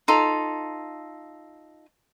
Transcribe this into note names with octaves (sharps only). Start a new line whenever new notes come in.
D#4 F4 A4